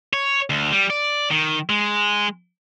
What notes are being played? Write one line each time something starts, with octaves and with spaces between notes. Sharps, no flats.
C#5
D2
G3
D5
D#3
G#3